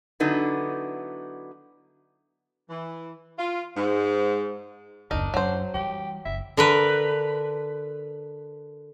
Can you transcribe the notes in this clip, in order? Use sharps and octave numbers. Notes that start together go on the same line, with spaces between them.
D3 F#3 B3 D#4 E4
E3
F4
G#2
F#1 D#2 D4 D#4 A#4
F#2 F#3 C5
E3 G3 G4
F#1 E5
D3 A#4 B4